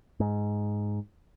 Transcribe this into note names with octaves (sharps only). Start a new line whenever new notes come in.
G#2